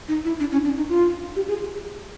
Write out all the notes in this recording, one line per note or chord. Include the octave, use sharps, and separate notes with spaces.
D#4
E4
D4
C#4
D4
D#4
F4
G4
G#4